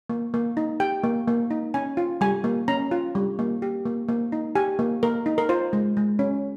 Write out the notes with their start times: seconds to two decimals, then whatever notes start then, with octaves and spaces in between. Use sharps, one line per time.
0.10 A#3
0.34 A#3
0.57 D#4
0.80 G4 G5
1.04 A#3
1.28 A#3
1.51 D#4
1.74 C#4 G#5
1.97 F4
2.21 G3 G#5
2.44 A#3
2.68 C#4 A#5
2.91 F4
3.15 G3
3.39 A#3
3.62 G4
3.86 A#3
4.09 A#3
4.32 D#4
4.55 G4 G#5
4.79 A#3
5.03 A#3 A#4
5.26 D#4
5.38 A#4
5.49 F4 C5
5.73 G#3
5.97 G#3
6.19 C#4